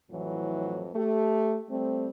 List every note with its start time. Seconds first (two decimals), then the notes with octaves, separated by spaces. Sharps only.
0.11 F2 A2 E3 F#3
0.94 A3 G4
1.69 G3 A3 C4